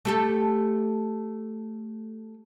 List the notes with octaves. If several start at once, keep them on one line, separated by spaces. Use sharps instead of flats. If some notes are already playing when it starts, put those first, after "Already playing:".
A3 G4 A4